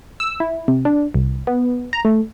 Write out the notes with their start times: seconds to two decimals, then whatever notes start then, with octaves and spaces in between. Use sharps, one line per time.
0.20 E6
0.40 E4
0.68 C3
0.85 D4
1.14 C2
1.47 B3
1.93 A#5
2.05 A3